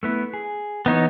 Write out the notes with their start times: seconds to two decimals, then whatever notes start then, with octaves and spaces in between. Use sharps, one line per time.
0.03 A3 B3 E4
0.34 G#4
0.86 E3 B3 D#4 C#5